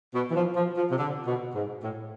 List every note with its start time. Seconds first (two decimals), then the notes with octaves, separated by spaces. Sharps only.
0.14 B2
0.31 E3
0.36 F3
0.56 F3
0.77 F3
0.91 C3
0.99 D3
1.27 B2
1.54 G#2
1.83 A2